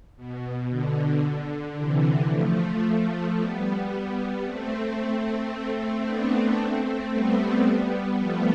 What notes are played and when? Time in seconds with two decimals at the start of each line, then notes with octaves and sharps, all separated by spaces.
0.17 B2
0.70 D3
1.24 D3
1.77 C3 E3
2.30 F3 A3
3.38 G3 B3
4.44 A3 C4
6.05 B3 D4
6.59 A3 C4
7.12 G3 B3
8.19 F3 A3